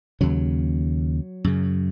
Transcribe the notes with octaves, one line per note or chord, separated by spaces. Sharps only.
D#2 C#3 F#3
F#2 C#3